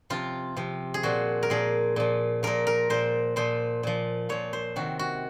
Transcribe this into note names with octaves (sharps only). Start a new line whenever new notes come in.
C3 F3 F4
C3 F3
G#4
A#2 F3 F#4
A#4
A#2 F3 G#4
A#2 F3
A#2 F3 A#4
A#4
A#2 F3 C5
A#2 F3 C5
A#2 F3
A#2 F3 C#5
C5
C3 D#3 F#4
F#4